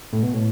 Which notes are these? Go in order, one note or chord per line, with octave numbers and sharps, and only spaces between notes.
A2
B2
A2